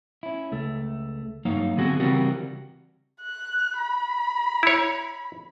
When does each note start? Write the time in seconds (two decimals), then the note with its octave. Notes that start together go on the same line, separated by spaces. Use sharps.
0.23 C#4 E4
0.52 C#2 A3
1.45 G2 F#3 A#3 D#4 C#5 F5
1.76 D3 B3 C4 F#4 G#4
2.00 C#3 E3 G3 C4 F#4 A#4
3.22 F#6
3.78 B5
4.63 E4 C#5